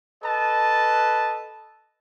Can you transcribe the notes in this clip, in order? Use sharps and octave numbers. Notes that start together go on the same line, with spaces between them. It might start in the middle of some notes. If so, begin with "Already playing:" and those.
A4 B4 D#5 A5